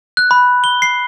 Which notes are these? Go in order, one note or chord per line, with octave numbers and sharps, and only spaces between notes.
F#6
B5
G7
C7